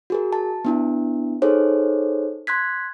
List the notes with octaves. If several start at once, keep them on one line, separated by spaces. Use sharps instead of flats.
F#4 G#4 A#4
A5
B3 D4 E4
D#4 G#4 A4 C5 C#5
C6 F#6 G#6 B6